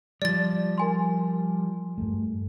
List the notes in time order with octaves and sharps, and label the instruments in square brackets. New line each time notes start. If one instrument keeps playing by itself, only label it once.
[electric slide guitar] F3 G3 [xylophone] D5 A6
[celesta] A#4 G#5 C6
[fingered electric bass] G2 G3 A3